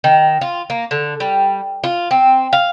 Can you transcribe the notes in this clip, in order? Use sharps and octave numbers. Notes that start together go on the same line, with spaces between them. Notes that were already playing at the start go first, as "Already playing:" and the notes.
D#3
F4
A#3
D3
G3
F4
C4
F5